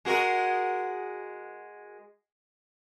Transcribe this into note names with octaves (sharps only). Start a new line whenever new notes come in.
G#3 F#4 A#4